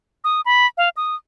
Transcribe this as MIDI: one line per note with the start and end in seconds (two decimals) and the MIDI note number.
0.24 0.41 87
0.46 0.67 83
0.78 0.89 77
0.97 1.15 87